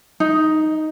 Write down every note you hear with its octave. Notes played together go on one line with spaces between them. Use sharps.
D#4